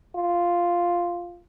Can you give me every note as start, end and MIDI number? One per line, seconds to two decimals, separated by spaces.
0.15 1.42 65